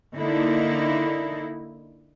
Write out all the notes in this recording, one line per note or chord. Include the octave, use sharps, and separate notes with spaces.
D3 A#3 D#4 E4